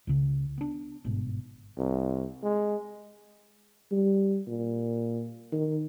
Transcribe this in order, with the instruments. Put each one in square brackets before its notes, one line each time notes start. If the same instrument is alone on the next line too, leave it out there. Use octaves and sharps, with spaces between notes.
[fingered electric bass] C#2 C#3
B3 D4
G1 G#2 B2
[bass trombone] C2
G#3
[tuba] G3
A#2
D#3